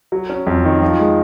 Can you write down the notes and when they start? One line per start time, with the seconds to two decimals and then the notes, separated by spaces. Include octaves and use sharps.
0.12 F#3
0.29 C#4
0.47 F2
0.64 D#3
0.81 F3
0.99 G#3